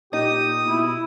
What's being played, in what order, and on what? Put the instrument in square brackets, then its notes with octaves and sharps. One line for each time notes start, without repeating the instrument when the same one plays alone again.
[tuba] A#2 [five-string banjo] D#4 [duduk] G4 [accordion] D#6
[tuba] B2 [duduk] E4